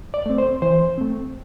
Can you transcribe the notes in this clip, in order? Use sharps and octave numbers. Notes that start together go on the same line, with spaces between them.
D5
A3 C4
C5
E3 C5
A3 C4